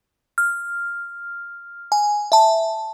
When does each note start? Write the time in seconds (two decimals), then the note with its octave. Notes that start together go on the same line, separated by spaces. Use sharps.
0.38 F6
1.92 G#5
2.32 E5 A5